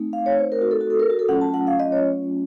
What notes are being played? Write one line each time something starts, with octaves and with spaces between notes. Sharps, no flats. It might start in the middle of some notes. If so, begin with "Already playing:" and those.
Already playing: A3 C4 D#4
F5
C#5
C5
A#4
F#4
A4
F#4
A4
A#4
F#4
A4
F#3 A3 C#4 F4 F#5
A5
F#5
F5
D#5
C#5